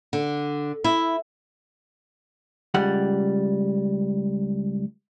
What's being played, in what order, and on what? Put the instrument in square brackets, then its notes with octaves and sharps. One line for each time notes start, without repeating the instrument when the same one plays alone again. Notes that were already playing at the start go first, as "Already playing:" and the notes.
[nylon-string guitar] D3
E4
[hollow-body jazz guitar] C#2 G3 F#5